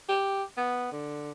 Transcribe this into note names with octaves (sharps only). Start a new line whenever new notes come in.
G4
B3
D3